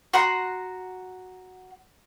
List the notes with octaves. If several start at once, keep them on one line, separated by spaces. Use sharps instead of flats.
F#4 F#5 A#5 C6